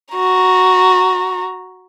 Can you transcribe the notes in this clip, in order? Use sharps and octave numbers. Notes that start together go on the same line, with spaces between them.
F#4 A#5